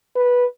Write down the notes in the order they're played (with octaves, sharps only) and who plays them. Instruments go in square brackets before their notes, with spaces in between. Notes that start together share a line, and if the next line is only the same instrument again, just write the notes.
[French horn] B4